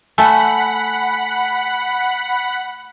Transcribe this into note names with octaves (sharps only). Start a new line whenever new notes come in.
A3 F#5 G#5 A5 B5